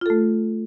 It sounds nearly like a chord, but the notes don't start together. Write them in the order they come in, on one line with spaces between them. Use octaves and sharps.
F4 A4 A3